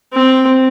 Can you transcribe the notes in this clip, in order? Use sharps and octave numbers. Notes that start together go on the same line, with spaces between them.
C4